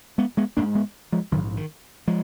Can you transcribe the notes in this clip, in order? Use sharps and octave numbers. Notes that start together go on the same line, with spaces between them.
G#3 B3
G#3 B3
G#1 A#3 D4
G#2
G#3 B3
F3 G#3
A#1 G#2 D#3 F#3
D#3
F3 G#3